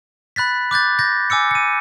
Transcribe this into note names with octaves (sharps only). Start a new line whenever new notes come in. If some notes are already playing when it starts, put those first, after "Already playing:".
B5 F#6 A6 B6
D6 F#6 G6 A6
G6 A6 A#6
G#5 D6 E6 C#7
C#7 D#7